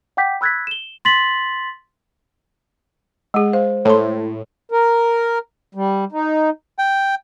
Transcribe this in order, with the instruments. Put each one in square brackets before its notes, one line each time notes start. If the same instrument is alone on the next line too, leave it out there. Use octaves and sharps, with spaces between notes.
[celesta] F#5 G5 D6 G6 B6
B5 E6 F#6 G#6 A6 B6
E7 G7
C6 A6 B6 F#7
[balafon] G#3 G#4 [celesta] F#5
[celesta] C5 [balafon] F5
[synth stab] A2 [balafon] A5 C6
[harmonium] A#4
G3
D#4
[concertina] G5